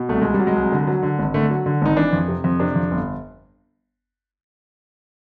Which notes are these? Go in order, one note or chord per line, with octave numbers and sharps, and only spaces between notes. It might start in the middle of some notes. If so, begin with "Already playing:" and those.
Already playing: B2
C2 A3
C2 G#3
G3
F#3
G#3
C2
D3
F#3
D3
G#1
D3 A3
F#3
D3
G#1 D#4
E3 D4
F2
C3
F2
C3 D4
F2
G1